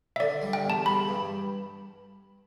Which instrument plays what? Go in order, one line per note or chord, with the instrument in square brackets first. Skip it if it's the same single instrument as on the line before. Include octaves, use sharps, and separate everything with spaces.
[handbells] E5
[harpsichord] D3 [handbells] D5
[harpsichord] G3
[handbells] G5
[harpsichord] E2
[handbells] A5
[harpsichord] G3 [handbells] B5
[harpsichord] G2